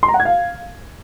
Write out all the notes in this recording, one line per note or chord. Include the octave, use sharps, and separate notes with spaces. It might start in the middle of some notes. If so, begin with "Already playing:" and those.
C6
A#5
F#5
G#6
F5